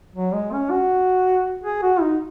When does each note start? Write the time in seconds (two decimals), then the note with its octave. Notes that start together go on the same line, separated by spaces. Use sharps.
0.15 F#3
0.34 G#3
0.52 C#4
0.71 F#4
1.64 G#4
1.82 F#4
2.01 D#4